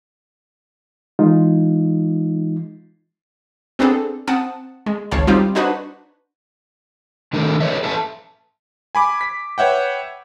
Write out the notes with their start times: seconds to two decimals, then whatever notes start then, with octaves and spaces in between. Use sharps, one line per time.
1.19 E3 G#3 D#4 F4
3.79 B3 C4 D4 G#4 A4
4.27 C4 F#5 A5 D#6
4.86 G#3
5.11 G#1 C#2 C#5 F5 A5
5.27 G3 C4 D#4 F4 G4
5.55 D4 D#4 F#4 B4 C5
7.33 D#3 A3 D4 A4 A#4
7.60 A4 B4 C#5 D#5 E5
7.83 A4 B4 E5 G#5 A5
8.95 G#5 B5 D6
9.21 B6
9.58 B4 C#5 E5 F#5 G5